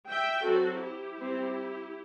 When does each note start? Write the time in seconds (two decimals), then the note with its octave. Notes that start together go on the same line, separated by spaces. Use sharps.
0.09 E5 G5
0.45 F#3 C4 F#4 A4
0.80 E4 G4
1.16 G3 C4